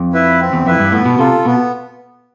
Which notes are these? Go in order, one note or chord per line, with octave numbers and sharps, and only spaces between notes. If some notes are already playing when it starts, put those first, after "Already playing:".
Already playing: F2
E4 B4 E5
C4
E2
F2 E4 B4 E5
G2
A2 B3
B2
C3 F4 A4
B2 B3